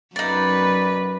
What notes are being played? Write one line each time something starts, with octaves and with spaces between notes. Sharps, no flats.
F#2 D#4 B4 D5